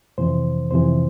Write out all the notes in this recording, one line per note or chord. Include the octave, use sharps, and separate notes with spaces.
F2 C3 E3 C5
F2 C3 E3 C5